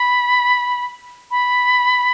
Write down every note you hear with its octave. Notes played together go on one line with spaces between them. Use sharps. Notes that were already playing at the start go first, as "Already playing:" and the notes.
Already playing: B5
B5